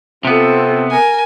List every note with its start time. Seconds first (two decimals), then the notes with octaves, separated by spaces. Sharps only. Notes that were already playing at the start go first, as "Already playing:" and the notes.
0.25 C3 B3 C4 F4 A4
0.91 A#4 G#5